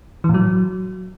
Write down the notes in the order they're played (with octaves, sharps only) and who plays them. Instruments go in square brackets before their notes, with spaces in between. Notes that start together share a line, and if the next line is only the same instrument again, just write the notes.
[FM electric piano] E3
A2
F#3